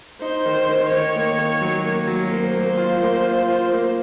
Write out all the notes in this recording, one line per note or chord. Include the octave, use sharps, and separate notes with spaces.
D#4 C5
D#3
D#3
D#3 C#5
A#3
D#3
F#3
A#3
F#3
A#3 C5
A#3
F4
A#3
F4
F4
A#3